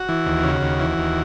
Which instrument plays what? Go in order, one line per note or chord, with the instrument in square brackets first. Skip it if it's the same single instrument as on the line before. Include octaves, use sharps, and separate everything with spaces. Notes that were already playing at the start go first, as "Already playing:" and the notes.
Already playing: [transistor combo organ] F#4
E3
D#2
C#3
D#2
E3
D#2